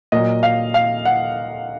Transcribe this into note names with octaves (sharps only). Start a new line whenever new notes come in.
A#2 F#3 D#5
F5
F5
F#5